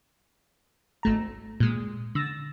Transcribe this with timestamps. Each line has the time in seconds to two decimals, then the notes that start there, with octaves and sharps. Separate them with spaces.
1.03 G#1 A3 A#5
1.60 A#2 G#3
2.15 D3 E6 A6 A#6